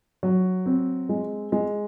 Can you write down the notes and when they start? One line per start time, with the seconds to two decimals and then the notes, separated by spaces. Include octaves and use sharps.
0.23 F#3
0.66 C4
1.09 G#3
1.52 G#3